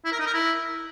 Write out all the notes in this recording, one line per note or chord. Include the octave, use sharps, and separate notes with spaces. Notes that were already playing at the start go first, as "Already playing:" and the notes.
E4
A#4
D#4
A#4
E4